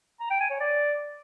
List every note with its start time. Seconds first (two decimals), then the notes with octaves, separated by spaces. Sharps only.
0.20 A#5
0.30 G5
0.40 G#5
0.50 C#5
0.60 D5